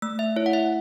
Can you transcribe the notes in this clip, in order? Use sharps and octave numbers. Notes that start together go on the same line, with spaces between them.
A3 E6
E5
E4 C#5
F#5
E5